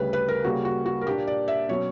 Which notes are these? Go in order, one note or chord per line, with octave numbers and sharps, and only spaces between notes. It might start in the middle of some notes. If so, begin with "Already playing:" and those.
Already playing: D2 C#3 G3 B4
B4
A#4
C#3 G3 A#3 F#4
F#4
F#4
A#4
A#2 A#3 D4 G4
D5
E5
B2 F#3 C#4 C#5